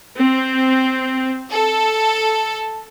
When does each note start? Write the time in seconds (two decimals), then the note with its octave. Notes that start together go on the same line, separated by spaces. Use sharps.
0.19 C4
1.51 A4